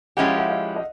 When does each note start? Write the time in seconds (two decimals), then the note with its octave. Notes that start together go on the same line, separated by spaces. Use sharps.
0.17 F3 G#3 C#4 E4 G4 F#5
0.27 F5
0.38 E5 F#5
0.49 D#5 F5
0.76 D#5